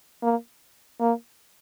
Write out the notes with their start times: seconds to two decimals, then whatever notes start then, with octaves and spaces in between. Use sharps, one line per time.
0.22 A#3
1.00 A#3